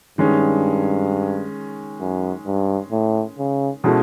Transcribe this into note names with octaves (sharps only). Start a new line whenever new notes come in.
G2 D#3 G#3 C#4
F#2
G2
A2
C#3
B2 G#3 C#4 E4 A4